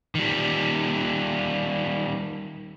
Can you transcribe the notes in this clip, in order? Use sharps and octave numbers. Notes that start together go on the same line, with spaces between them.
D#3 G3